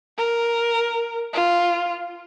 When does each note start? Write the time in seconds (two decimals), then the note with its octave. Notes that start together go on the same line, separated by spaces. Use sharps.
0.18 A#4
1.33 F4